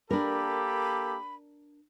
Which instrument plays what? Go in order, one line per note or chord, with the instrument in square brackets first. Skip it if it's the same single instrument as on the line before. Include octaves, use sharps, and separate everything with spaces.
[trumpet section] A#3 G4 A4 [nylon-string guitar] D4 A#4 [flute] B5